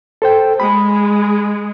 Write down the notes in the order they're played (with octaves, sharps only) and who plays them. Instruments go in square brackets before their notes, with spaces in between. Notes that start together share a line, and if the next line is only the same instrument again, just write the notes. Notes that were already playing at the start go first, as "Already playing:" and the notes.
[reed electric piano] A4 C5 G5
[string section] G#3 [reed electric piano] B5